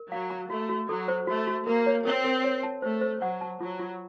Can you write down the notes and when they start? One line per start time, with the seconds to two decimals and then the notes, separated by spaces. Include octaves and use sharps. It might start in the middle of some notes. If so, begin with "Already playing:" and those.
Already playing: A#4
0.11 F#3 F5
0.30 A#5
0.50 A3 F#4
0.69 F#4
0.89 F#3 A4
1.08 C5
1.27 A3 F#4
1.47 F#4
1.66 A#3 A#4
1.86 C#5
2.05 C4 A#4
2.24 A#4
2.44 C#5
2.63 A5
2.82 A3 C5
3.01 C5
3.21 F#3 F#5
3.41 A5
3.60 F#3 F4
3.79 F4